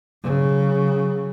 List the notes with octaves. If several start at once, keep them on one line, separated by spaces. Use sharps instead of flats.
C#3 F#3